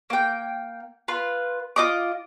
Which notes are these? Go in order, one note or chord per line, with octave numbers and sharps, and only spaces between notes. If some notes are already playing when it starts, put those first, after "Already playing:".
A#3 G5
F4 B4
F4 D#5 D6